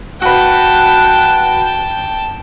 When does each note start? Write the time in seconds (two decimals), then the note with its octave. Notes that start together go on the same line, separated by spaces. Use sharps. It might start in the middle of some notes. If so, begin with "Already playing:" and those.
0.22 F#4 B4 F#5 G5 A5